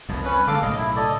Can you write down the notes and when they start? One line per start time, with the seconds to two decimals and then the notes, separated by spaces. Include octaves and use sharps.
0.09 C2 F2
0.25 C#4 B4
0.47 D3 G#3 A4 F5 D6
0.62 B1 A2 C#3 D#5
0.77 E4
0.96 A4 D5 D#5